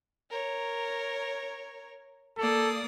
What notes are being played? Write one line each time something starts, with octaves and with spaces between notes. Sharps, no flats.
A#4 C#5
A#3 A4 D5 D#6